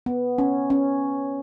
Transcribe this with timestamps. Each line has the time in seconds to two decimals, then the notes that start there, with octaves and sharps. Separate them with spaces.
0.06 B3
0.38 C#4
0.70 C#4